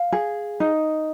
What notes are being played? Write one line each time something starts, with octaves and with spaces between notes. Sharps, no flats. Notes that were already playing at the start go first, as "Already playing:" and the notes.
Already playing: F5
G#4
D#4